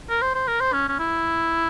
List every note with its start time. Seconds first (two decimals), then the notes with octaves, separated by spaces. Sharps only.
0.10 A#4
0.22 C5
0.35 C5
0.48 A#4
0.60 C5
0.73 C#4
0.89 C#4
0.99 E4